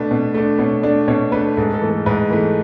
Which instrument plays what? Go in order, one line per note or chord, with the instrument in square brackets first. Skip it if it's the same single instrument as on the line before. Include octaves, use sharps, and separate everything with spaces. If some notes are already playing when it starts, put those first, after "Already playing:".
Already playing: [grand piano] B2 A3 D4 B4
B2
A3 D4
B2 C#5
A3 D4 D5
B2 C#5
A3 D4 B4
G#2 A4
A4
E3 A3
A4
G#2 B4
E3 A3